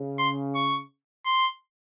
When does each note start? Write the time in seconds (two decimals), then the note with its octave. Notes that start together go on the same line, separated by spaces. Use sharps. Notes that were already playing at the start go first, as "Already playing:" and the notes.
Already playing: C#3
0.18 C6
0.55 C#6
1.26 C6